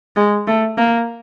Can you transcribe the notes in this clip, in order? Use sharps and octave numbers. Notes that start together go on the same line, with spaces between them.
G#3
A3
A#3